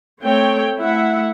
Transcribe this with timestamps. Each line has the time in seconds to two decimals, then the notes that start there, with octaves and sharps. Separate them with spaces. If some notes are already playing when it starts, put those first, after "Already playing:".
0.20 A3 C4 C#5 G5
0.78 A3 E4 E5 F#5